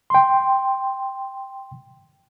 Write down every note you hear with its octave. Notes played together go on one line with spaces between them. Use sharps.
G5 C6